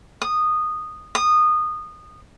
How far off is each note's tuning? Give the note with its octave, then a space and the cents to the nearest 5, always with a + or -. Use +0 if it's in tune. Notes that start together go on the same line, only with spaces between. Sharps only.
D#6 -10
D#6 -20